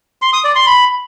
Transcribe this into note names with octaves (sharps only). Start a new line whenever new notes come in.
C6
D#6
D5
C6
B5